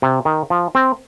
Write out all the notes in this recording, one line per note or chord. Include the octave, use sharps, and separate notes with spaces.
C3
D#3
F3
C4